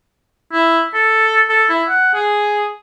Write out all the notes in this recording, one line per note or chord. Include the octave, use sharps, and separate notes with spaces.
E4
A4
A4
E4
F#5
G#4